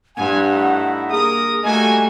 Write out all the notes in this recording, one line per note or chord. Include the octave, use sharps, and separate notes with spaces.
G2 C4 E4 F#5 G#5
A3 D#4 E4
A#3 G#4 A#4 D#6
G3 A3 A#3 F#4 D#5 G#5